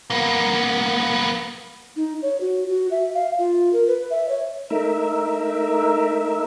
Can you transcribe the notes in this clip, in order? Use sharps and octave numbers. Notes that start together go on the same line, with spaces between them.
A#3 B3
D#4
C#5
F#4
F#4
E5
F5
F4
A#4
B4
E5
C#5
A3 D#4 A#4 E5